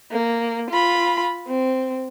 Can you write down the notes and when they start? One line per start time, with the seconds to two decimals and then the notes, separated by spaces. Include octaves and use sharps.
0.12 A#3
0.70 F4 B5
1.47 C4